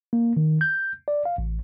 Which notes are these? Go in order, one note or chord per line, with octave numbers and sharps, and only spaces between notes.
A#3
D#3
G6
D5
F5
A1